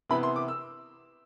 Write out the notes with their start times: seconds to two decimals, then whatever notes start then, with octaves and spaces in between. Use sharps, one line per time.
0.09 C3 E3 B3 B5
0.23 C6
0.36 D6
0.48 E6